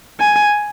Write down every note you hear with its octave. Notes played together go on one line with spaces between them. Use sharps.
G#5